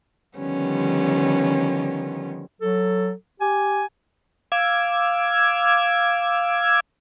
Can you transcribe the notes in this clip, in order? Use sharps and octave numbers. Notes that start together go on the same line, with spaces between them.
D3 D#3 F3 G3 B3 C#4
F#3 A4
G4 G#5
F5 D6 E6 G#6